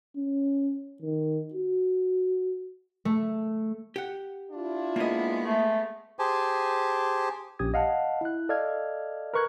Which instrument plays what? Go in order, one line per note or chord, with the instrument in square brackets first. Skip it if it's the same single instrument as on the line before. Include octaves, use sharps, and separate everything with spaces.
[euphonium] C#4
D#3
F#4
[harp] A3
[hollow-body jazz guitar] G4 F#5
[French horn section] D4 E4 F4
[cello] G#3 B3 [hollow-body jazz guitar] A#3 D#5
[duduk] A3
[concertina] G4 G#4 C5 G#5 A5
[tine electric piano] A#1 C#4 G4 D#6 G#6
D#5 F5 F#5 A5
E4 F#6
A4 D5 D#5 F5 F6 G#6
A#4 B4 C#6 F#6 G#6